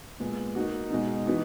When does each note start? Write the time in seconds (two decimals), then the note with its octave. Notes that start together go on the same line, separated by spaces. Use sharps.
0.20 A#2 G#3 B3
0.55 A#3 D#4 F#4
0.91 B2 G#3 D#4
1.26 E3 B3 D#4 F#4